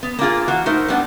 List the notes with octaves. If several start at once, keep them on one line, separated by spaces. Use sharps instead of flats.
B3
A#3 D4 F4 G#4
E3 A#3 F#4
A3 D#4 A#4 C5
G3 B3 D4